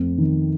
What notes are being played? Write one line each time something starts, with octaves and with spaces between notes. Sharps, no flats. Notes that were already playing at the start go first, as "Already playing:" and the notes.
Already playing: F2 A3
D#3